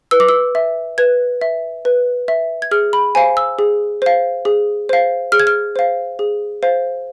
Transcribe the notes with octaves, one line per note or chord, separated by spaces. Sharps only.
B4 E6
D6
E6
E5
B4 G#6
E5
B4
E5
G#6
G#4 F6
B5
C5 F5 G#5
E6
G#4
C5 F5
G#4
C5 F5
G#4 F6
G#6
F6
C5 F5
G#4
C5 F5